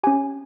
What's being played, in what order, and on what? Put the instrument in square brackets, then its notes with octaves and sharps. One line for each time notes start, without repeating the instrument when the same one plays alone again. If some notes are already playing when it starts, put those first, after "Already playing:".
[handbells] C#4 G4 G#5